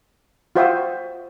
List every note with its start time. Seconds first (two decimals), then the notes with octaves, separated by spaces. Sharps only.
0.55 F4 F#4 C5 E5 G5 D#6